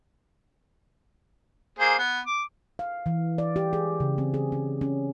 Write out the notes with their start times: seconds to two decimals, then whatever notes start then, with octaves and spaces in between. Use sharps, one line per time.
1.79 A#3 G#4 C5
1.98 B3
2.26 D6
2.79 F5
3.06 E3
3.38 D5
3.56 G4
3.73 G#4
4.00 C#3
4.18 C4
4.34 G#4
4.52 C#4
4.81 C#4